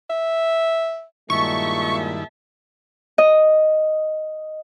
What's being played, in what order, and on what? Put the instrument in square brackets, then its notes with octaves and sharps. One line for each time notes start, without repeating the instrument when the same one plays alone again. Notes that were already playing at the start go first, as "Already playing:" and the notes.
[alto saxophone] E5
[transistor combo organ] G2 D#3 E4 [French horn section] A#2 G#3 [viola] E5 A5 [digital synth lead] C#6
[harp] D#5